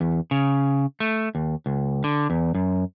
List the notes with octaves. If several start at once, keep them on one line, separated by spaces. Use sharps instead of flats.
E2
C#3
A3
D#2
C#2
D3
E2
F#2